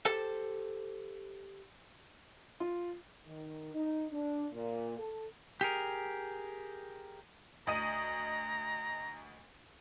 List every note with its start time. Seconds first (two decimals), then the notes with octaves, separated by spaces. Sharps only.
0.05 G4 A4 C5 A5
2.60 F4
3.27 D#3
3.74 D#4
4.12 D4
4.52 A#2
4.99 A4
5.61 G4 G#4 A#4
7.67 D2 D#5 A#5 D#7